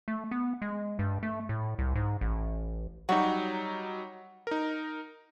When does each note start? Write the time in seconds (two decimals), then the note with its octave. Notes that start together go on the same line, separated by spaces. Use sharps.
0.08 A3
0.31 B3
0.62 G#3
0.99 G2
1.23 A3
1.49 A2
1.79 C2
1.95 G#2
2.21 A1
3.09 F#3 G3 D#4 F#4
4.47 D#4 A#4